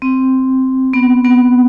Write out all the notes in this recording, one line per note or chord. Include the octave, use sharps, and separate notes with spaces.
C4
B3
B3